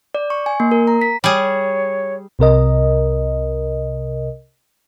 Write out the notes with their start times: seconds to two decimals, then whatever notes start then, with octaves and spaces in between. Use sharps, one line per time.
0.15 D5
0.30 C#6
0.46 G#5
0.60 A#3
0.71 A#4
0.87 A#5
1.01 B6
1.24 G3 G#4 C#5
2.39 C2 C3 A#4 D#5